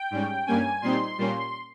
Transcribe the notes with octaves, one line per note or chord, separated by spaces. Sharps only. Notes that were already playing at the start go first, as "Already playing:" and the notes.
Already playing: G5
G#2 G3 C#4
G2 G3 A#3 C#4 G#5
A#2 G3 C4 D#4 C6
A#2 G3 A#3 C#4